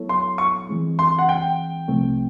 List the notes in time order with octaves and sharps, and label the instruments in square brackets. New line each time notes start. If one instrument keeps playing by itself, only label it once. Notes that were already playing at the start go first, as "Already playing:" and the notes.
Already playing: [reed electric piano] F#3 B3 E4 A4 C#5
[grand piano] C6
C#6
[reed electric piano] E3 G#3 C4
[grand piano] C6
F#5
G5
[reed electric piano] C2 C3 F3 A3 C4